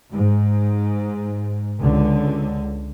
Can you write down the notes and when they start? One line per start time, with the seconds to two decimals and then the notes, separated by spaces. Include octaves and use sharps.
0.11 G#2
1.82 C#2 D3